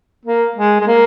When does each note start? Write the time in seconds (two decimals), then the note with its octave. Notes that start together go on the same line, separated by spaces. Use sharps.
0.25 A#3
0.56 G#3
0.80 G#3
0.87 A#3